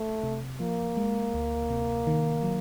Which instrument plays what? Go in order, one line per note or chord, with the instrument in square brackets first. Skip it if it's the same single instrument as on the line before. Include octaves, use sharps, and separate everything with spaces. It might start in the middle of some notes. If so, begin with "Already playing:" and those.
Already playing: [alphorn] A3
[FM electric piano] C3
[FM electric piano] F3 [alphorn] A#3
[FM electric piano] G#3
D2
C3
D#3
F#3